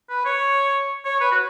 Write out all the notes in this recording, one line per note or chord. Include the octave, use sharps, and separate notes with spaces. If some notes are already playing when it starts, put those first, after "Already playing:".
B4
C#5
C#5
B4
F#4